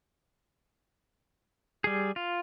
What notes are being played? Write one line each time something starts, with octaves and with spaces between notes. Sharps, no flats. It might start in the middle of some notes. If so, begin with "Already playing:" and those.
G3 G#4
F4